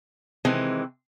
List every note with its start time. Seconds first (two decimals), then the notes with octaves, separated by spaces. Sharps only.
0.45 C3 D#3 E3 G#3 C4